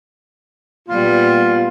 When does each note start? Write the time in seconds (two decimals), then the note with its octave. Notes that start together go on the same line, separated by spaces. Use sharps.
0.89 A#2 G3 B3 F4